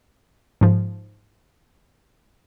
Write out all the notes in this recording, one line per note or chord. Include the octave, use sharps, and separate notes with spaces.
G#2 F3